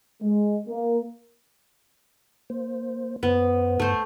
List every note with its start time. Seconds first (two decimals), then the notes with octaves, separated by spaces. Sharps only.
0.22 G#3
0.68 A#3
2.50 A#3 C5
3.23 F#2 B3 C5
3.80 G2 A3 C5